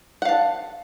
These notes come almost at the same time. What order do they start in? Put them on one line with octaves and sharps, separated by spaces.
F#5 F5 A5